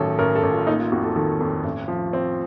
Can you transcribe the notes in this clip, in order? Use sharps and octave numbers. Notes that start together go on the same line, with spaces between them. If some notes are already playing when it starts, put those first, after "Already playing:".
Already playing: A1 D#3 F#3 A4
A1 A#4
A4
A1
F4
A#3 D#4
F4
F2 F#4
A4
D#3 A4
F2
A1
F3
C4